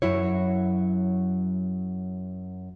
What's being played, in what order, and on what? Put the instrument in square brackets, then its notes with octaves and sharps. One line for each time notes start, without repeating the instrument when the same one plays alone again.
[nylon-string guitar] F#2 F#3 E4 C#5